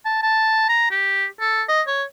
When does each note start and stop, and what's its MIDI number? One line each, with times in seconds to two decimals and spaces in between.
0.05 0.18 81
0.22 0.65 81
0.69 0.87 82
0.91 1.26 67
1.40 1.63 69
1.69 1.82 75
1.87 2.03 73